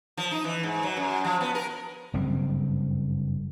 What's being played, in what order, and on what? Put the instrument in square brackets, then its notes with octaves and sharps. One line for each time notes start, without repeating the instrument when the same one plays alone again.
[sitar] F3
D#4
E3
G#2
F#3
F#2
F3
B3
A#4
[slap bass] F#1 G2 G3 C4